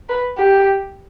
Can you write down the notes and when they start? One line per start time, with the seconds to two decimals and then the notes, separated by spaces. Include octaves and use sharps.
0.09 B4
0.38 G4